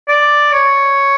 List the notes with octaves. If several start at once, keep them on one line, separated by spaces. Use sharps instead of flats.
D5
C#5